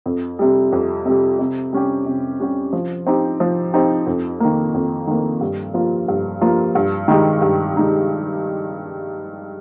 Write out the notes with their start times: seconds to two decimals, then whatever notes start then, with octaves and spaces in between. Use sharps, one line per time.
0.06 F2
0.39 C3 G3
0.72 F2
1.06 C3 G3
1.39 C3
1.73 G3 C#4 G4
2.06 C3
2.40 G3 C#4 G4
2.73 F3
3.07 C4 D#4 G4
3.40 F3
3.74 C4 D#4 G4
4.07 F2
4.40 D#3 A#3
4.74 F2
5.07 D#3 A#3
5.41 G2
5.74 F3 A#3 F4
6.08 G2
6.41 F3 A#3 F4
6.75 G2
7.08 D#3 G#3 D#4 G4
7.42 G2
7.75 D#3 G#3 D#4 G4